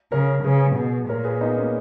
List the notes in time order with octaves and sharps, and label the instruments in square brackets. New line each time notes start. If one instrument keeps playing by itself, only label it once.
[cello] C#3 [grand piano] A#4 C#5
[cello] C#3 [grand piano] G#4 B4
[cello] B2
[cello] A#2 [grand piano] A#4 C#5
[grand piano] G#4 B4
B3 D#4
A#3 C#4